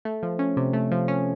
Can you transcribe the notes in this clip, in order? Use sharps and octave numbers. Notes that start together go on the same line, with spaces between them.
A3
F3
C#4
C3
A3
F3
C#4